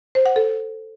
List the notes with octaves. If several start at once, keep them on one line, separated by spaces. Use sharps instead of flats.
C5
F#5
A4